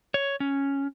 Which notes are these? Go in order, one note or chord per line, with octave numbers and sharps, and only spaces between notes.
C#5
C#4